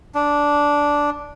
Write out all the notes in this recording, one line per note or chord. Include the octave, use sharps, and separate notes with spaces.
D4